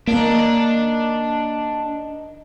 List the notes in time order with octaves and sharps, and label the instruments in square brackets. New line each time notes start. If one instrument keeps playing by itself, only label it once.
[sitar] D#3 A#4 [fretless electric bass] A#3 [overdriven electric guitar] D4